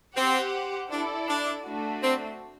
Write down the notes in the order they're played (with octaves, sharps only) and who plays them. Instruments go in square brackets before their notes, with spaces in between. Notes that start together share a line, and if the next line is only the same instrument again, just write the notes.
[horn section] C4 [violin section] G4 C5 F#5
[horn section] D4 [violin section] E4 A4 D5
[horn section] D4
[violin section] A3 D4 F#4
[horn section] C4